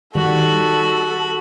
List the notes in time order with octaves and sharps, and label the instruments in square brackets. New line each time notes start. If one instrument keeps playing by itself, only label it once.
[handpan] D#3 [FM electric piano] G3 [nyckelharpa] F#4 B5 [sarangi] A4